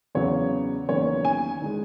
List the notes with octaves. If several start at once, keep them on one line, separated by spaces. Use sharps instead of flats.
E2 C#3 F#3 B3 C#5
E2 D#3 F#3 A#3 C#4 C#5
G#5
D#3 G#3 D#4